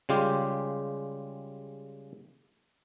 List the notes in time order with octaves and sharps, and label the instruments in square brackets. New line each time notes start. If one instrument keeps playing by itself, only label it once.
[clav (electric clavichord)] C#3 G3 G#3 F4 G4